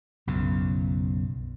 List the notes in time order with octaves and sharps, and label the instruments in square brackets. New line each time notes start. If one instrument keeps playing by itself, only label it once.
[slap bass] B1 F#2 C#3